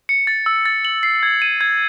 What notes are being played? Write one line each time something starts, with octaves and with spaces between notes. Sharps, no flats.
C#7
A6
E6
A6
F#7
C7
G#6
D#7
G#6